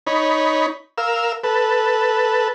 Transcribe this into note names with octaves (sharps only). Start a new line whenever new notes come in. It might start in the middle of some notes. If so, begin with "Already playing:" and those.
D#4 C#5 B5
A#4 F5 E6
A4 B4